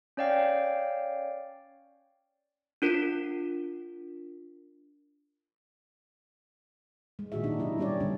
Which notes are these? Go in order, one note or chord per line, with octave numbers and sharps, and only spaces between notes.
C#4 C#5 D5 F5 G5
D4 F4 A#4 B6
G#3
A#2 D#3 F#4 G#4 E5
A#3 D4 D#4 G4 G#4
C3 F#3 E4 D#5
G3 B3 C#4 G4 C#5 D5
D3 F#3 G3 C#4 D4